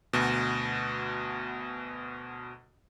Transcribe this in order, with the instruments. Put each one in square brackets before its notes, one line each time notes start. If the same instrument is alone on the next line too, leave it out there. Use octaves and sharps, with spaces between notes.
[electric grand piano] D2 B2